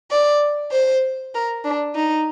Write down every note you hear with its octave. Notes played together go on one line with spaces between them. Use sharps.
D5
C5
A#4
D4
D#4